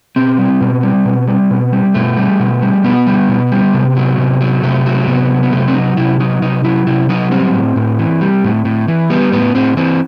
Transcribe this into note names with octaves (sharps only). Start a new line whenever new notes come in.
B2 C4
G3
B2
G3
B2
G3
B2
G3
B2 A3
G3
B2
G3
B2 B3
G3
B2
G3
C3
F#3
C3
F#3
C3 A3
F#3
C3 B3
F#3
B3
C3 A3
C4
F#3 D#4
C3 E4
F#3 D#4
C3 D#4
F#3 E4
C3 E4
F#3 D#4
G3 C4
A2
A2
E3
G3
A2
A2
E3
G3 B3
A2 B3
A2 C4
E3 C4